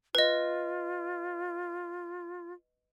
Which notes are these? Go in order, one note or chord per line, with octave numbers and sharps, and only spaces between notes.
F4 B4 D#5